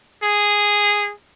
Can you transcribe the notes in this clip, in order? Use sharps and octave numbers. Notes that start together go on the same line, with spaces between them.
G#4